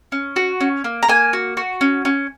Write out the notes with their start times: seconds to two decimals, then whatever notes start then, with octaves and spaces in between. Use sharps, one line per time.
0.12 C#4
0.36 F#4
0.61 C#4
0.84 A#3
1.03 A#5
1.08 A#3 G#5
1.33 F#4
1.57 F#4
1.81 C#4
2.05 C#4